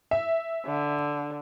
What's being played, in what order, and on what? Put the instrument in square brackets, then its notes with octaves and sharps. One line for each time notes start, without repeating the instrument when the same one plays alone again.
[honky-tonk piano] E5
[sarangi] D3